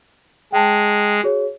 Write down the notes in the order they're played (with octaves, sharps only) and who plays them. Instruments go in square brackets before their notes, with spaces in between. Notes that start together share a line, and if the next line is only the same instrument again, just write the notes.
[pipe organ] G#3 [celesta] G5 A5
[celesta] F#4 G#4 C#5